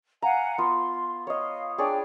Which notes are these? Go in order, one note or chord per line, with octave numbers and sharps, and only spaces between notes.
F5 F#5 G#5 A#5
B3 F4 C6
C#5 D#5 F5
D4 G#4 C#5 D5 G5